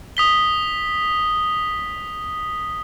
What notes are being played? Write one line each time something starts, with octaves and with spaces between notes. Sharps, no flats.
D#6 B6 G7